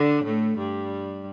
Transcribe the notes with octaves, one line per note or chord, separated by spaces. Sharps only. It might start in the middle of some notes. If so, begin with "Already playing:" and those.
Already playing: D3 D4
A2 A3
G2 G3